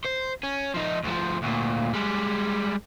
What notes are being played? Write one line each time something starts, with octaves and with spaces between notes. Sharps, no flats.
C5
C#4
F3 D#4
D2 F3
D2 A#2
G3 G#3